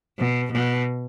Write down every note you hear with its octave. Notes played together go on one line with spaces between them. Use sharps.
B2
B2